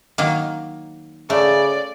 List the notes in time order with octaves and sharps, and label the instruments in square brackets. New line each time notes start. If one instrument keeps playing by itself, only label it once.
[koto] D#3 F#3 A#3
[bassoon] C#3 [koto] A3 [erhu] D5